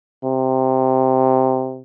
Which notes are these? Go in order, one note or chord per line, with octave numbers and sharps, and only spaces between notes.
C3